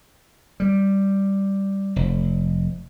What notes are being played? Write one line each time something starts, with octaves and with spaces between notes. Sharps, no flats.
G3
F1